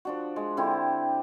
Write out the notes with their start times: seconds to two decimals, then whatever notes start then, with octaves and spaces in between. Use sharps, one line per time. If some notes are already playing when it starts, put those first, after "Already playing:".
0.05 F3 D4 F#4
0.36 G#3
0.57 D3 C4 E4 G4